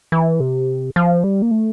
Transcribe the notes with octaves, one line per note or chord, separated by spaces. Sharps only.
E3
C3
F3
G3
A#3
A3